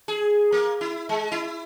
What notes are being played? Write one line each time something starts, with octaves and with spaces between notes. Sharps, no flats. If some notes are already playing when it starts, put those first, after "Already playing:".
G#4
A#3
E4
G#3
E4